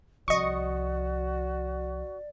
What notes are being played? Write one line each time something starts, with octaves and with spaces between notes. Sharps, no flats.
C2 F3 F#4 D5 D#5 C#6